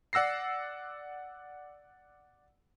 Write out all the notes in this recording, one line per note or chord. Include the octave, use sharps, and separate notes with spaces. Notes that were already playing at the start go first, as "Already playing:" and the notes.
D5 F#5 E6 A#6 C7